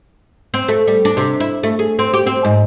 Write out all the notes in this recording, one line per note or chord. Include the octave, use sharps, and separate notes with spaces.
C4
A3
G3
D4
C3
E4
A3
G#4
C4
G4
C4
G#2